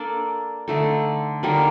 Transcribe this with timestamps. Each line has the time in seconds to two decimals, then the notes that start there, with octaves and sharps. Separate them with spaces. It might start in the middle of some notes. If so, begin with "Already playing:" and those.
Already playing: A#3 D4 A4 D5
0.68 D3 A3 D#4 A4
1.43 D3 G3 A#3 D#4